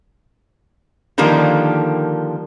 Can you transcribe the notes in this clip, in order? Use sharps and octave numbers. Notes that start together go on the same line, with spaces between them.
D3 D#3 F3 G3 A#3